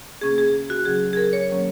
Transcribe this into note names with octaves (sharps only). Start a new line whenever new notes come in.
C#3 A#3 C#4 G#4
G#4
G#4
F#4
C#3 F#3 C#4 G#4
G#4
A#4
C#5
D#3 F#3 A#3 C#4 C#5